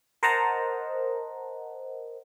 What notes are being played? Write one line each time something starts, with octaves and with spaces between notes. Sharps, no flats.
A#4 C5 D#5 F#5 A5 A#5